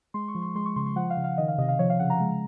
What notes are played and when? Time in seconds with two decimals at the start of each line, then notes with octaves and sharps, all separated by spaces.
0.14 G#3 C6
0.28 C#6
0.35 F3
0.42 C6
0.55 G#3 C6
0.66 C#6
0.76 C#3 C6
0.86 C6
0.96 F3 F#5
1.10 F5
1.17 C#3
1.24 F5
1.38 D#3 D#5
1.48 F5
1.58 C3 D#5
1.69 F5
1.79 F3 C#5
1.90 F5
1.99 C#3 F#5
2.10 A#5
2.20 G#3